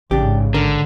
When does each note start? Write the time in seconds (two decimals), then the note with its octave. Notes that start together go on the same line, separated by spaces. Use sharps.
0.11 A1 G#2 C#3 D4 G4
0.54 D3 A#4